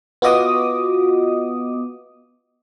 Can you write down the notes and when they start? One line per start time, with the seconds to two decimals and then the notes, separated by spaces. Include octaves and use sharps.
0.22 B3 F4 F#4 D#5 D6 D#6